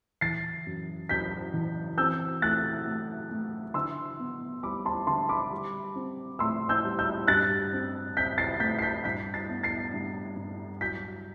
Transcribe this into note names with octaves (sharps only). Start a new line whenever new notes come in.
E3 A6 C7
F#2
F#2 G6 B6
E3
C4 E6 G6
A3 F#6 A6
A3
A3
D3 C6 E6
B3
G3 B5 D6
A5 C6
D3 A5 C6
B5 D6
G3
C4
A2 C6 E6
E6 G6
G3
E6 G6
G2 F#6 A6
C4
C4 G6 B6
A6 C7
A3 G6 B6
C7
G6 B6
G2 G6 B6
A6 C7
B3
A6 C7
G2
G2
F#3 G6 B6